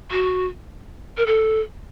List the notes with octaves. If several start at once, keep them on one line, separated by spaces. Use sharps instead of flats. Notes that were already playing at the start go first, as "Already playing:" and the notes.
F#4
A#4
A4